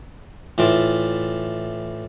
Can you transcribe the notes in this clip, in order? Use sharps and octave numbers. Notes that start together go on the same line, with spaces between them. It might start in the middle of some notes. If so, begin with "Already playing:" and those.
A2 E3 F4 D5